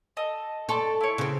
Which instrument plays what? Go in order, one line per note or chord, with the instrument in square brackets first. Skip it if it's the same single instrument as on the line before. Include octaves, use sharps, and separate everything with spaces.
[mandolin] A4 D#5
[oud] A4 [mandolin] D5 C6 C#6
[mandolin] E4 C#5
[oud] C#3 C4